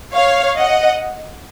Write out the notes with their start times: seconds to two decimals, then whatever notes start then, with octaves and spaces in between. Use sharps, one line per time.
0.13 C#5 F5
0.56 D#5 F#5